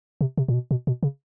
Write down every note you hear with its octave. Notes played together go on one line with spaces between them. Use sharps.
C3
C3
A#2
B2
B2
B2
C#3